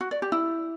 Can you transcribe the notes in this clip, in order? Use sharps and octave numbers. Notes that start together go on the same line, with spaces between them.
F#4
D5
G4
E4